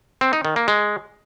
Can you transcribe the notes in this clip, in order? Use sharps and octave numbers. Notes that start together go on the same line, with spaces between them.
C4
D#4
D#3
A#3
G#3